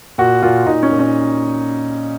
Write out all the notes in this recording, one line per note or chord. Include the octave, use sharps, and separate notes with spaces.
A#2 F#4
A#2 F4
A#2 D#4
C#4
A#2
C#4